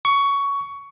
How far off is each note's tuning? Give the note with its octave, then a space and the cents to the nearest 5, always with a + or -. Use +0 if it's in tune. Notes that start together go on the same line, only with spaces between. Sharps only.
C#6 +15